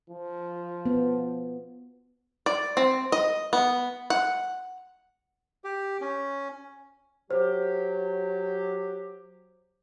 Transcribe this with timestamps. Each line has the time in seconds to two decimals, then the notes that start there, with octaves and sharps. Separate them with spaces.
0.10 F3
0.86 B3
2.46 D5
2.77 C4
3.12 D#5
3.53 B3
4.10 F#5
5.64 G4
6.01 C#4
7.31 F#3 G4 C5